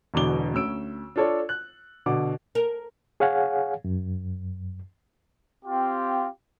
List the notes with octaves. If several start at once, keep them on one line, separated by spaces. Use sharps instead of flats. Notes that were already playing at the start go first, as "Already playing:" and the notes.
E1 E2 B2 D3 D6 G7
D2 C#4 E6 D7
D4 F4 A4 C#5 D5
F#6
B2 D3 F#5 D6
A#4
G#4 C#5 F5 F#5 G#5
F#2
C4 F4 G4